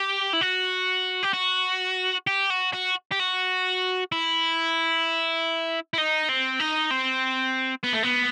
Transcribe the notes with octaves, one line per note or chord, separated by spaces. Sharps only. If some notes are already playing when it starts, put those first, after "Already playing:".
Already playing: G4
E4
F#4
G4
F#4
G4
F#4
F#4
G4
F#4
E4
E4
D#4
C4
D#4
C4
B3
A3
B3